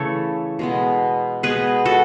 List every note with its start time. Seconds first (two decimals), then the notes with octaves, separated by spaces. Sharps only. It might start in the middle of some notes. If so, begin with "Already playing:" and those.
Already playing: C#3 E3 A3 E4 A4 C#5
0.59 B2 G#3 B3
1.43 B2 G#3 B3 G#4 B4
1.85 F#4 A4